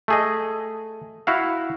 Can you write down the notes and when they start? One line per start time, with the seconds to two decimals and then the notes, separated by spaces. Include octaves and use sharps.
0.08 A3 G#4 D#5
1.27 E4 F#4 F5